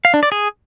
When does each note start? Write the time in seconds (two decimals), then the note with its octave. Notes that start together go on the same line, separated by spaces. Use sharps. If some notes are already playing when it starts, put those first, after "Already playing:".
0.05 F5
0.14 D4
0.23 D5
0.32 G#4